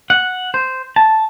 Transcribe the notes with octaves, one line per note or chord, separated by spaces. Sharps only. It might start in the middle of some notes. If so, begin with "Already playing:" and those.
F#5
C5
A5